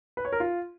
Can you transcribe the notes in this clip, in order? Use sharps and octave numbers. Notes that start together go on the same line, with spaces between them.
B4
C#5
A#4
F4